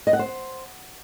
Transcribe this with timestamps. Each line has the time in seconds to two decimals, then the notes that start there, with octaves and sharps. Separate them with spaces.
0.07 D#5
0.13 F#5
0.19 C5